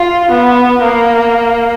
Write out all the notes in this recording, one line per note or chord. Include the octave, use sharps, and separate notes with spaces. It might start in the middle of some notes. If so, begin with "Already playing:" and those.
Already playing: F4
B3
A#3